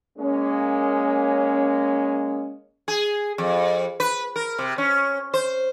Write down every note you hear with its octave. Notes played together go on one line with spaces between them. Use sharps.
G#3 A#3 C#4
G#4
F2
B4
A#4
C3
C#4
C5